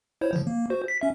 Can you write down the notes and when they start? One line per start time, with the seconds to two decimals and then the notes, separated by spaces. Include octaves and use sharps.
0.21 E4 C5 C#5
0.33 D3 F3
0.47 A#3
0.70 F#4 C5
0.88 B6
1.01 C#4 E5